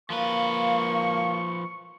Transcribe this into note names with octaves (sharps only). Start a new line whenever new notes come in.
F3 A#3 B4 F5 C#6